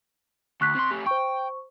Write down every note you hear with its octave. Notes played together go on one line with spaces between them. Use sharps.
D2 C#6 F#6 B6
C3 C6
A3 G4
C5 G5 C#6